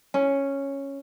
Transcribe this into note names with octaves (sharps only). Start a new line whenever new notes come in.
C#4